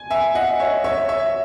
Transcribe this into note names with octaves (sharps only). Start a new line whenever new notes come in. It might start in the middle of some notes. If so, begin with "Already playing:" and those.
Already playing: G#5
E5 G#5
D#5 F#5
C#5 E5
C#5 E5
C#5 E5